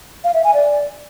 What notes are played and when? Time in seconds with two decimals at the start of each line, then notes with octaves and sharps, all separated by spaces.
0.24 F5
0.34 E5
0.44 G#5
0.54 D5